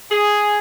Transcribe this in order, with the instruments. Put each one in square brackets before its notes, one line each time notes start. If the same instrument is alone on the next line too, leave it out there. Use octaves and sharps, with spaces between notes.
[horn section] G#4